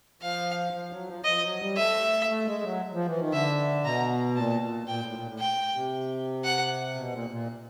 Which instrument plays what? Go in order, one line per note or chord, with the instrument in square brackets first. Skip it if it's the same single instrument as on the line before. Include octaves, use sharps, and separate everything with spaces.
[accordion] F3 [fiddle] F5
[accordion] F3
F#3
F3
[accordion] F3 [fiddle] D#5
[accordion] F#3
G3
[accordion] A3 [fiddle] E5
[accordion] A3
G#3
F#3
F3
E3
D#3
[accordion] D3 [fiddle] E5
[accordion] B2 [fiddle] A#5
[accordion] A#2 [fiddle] A5
[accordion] A#2
[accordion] A#2 [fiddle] G5
[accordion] A2
A#2
A2
[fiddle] G5
[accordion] C3
[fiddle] F#5
[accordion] B2
A#2
A#2